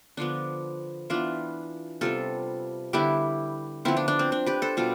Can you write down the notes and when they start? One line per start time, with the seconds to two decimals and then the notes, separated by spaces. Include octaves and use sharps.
0.17 D3 F3 B3 D4
1.10 E3 B3 D4 F4
2.01 C3 G3 B3 F4 A4
2.93 D3 G3 B3 E4 G4
3.85 D3 F3 B3 C4 E4
3.97 D4
4.08 D4
4.19 C4
4.32 D4
4.46 G4 B4
4.62 A4 C5
4.77 B2 G3 F4 A4